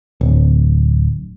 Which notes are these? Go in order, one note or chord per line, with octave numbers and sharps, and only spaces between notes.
D1